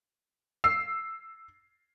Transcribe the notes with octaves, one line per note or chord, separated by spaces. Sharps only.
E6 C7